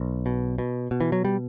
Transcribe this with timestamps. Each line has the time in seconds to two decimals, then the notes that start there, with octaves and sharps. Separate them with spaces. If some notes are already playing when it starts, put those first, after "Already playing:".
Already playing: B1
0.26 B2
0.58 B2
0.91 B2
1.01 E3
1.12 F#3
1.25 G3